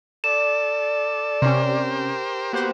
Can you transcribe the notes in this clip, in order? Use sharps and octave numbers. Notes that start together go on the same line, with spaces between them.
A4 D5 E7
C3 C#4 G4 A#4 C5
A#3 B3 F#4 G4 C5